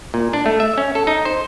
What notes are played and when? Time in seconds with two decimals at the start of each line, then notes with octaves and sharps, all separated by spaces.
0.14 A#2
0.33 D4
0.46 A3
0.60 E5
0.78 C#4
0.95 A4
1.07 D#4
1.25 C5